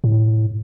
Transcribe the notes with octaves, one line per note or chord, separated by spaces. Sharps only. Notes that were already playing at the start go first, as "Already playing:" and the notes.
A2